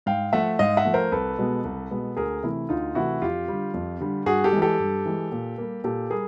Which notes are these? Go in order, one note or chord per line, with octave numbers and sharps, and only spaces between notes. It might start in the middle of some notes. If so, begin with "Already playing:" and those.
G#2 F5 G5
F3 A3 E5 F#5
G#2 D#5 F5
E5 F#5
F3 A3
A#4 C5
C2 A4 B4
B2 G#3 B3
C2
B2 G#3 B3
D2 G#4 A#4
C3 E3 A3 E4
D2 D#4 F4
C3 E3 A3 E4 F#4
F2 F4 G4
D3 G3
F2
D3 G3
G2 F#4 G#4
G4 A4
E3 G#3
G4 A4
G2
E3 G#3
A#2
G3 A#3
A#2 G4 A4
G3 G#4 A#4